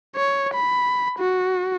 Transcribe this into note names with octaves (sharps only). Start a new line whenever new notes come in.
C#5
B5
F#4